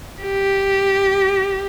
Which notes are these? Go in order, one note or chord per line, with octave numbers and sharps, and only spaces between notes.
G4